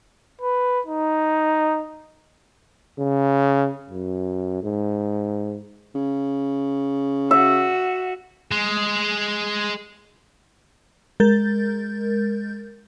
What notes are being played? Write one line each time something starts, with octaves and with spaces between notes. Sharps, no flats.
B4
D#4
C#3
F#2
G#2
C#3
F#4 E5
G#3
G#3 A#4 G6 A6